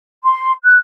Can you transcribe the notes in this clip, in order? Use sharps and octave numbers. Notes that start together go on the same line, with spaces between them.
C6
F#6